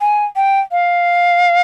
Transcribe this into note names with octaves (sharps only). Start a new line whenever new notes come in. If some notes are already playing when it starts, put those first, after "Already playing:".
G#5
G5
F5